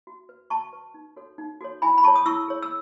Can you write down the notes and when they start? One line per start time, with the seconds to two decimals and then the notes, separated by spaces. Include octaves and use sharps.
0.07 F#4
0.29 B4
0.50 F#4 A5 C#6
0.73 B4
0.94 D#4
1.16 F#4 A4 C#5
1.38 D#4
1.61 F#4 A4 C#5
1.82 E4 G#5 B5
1.98 B5
2.04 G#4 C#5 A5 C#6
2.16 D#6
2.26 E4 C#6 E6
2.48 G#4 C#5
2.62 E6